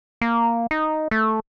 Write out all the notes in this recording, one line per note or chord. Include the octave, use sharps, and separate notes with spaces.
A#3
D#4
A3